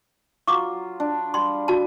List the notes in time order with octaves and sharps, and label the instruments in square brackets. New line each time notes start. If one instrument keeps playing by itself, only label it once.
[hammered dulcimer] F#3 F4 [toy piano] C#6 D6
[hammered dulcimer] D4
[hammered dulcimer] G3 [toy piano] C6
[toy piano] F#4 A5